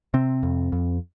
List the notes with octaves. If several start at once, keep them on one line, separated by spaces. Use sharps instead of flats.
C3 C4
F2
F2